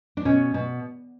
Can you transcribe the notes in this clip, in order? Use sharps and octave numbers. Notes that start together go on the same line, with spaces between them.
D4
B2 C#4
B2